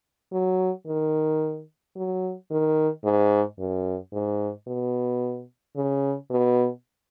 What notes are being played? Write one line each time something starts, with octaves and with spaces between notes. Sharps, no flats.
F#3
D#3
F#3
D#3
G#2
F#2
G#2
B2
C#3
B2